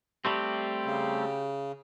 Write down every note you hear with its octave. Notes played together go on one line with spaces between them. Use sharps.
G3 A3 C4 G4
C#3